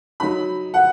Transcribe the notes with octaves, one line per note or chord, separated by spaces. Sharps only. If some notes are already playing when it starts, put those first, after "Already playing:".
F#3 D#4 B5
F#5